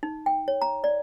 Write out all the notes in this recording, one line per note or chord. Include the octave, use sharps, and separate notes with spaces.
D#4
G5
C#5
A#5
D5